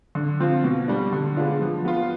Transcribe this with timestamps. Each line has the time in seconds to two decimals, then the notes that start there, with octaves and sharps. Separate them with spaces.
0.15 D3
0.40 F3 C4 F4
0.64 B2
0.88 G3 D4
1.13 D3
1.37 G#3 B3 D4 F4
1.61 F3
1.85 B3 F4